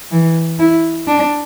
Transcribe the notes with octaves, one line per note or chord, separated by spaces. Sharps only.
E3
E4
D4